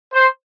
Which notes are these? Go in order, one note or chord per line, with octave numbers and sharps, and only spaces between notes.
C5